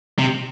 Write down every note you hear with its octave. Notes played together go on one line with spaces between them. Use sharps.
C3